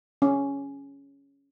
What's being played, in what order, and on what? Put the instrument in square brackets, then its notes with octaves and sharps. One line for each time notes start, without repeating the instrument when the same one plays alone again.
[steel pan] C#4